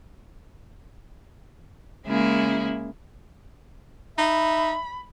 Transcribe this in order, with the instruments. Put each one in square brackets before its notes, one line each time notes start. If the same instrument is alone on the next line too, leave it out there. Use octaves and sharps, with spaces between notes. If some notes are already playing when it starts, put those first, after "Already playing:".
[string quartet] C#3 G#3 A#3 E4 G#4
[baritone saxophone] D#4 [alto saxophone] E5 [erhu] B5